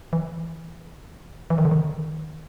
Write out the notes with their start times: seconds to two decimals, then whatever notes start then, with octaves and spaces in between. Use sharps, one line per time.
0.13 E3
1.50 E3
1.58 D#3
1.65 D3
1.71 D#3